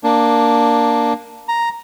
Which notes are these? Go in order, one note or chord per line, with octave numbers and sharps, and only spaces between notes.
A#3 D4
A#5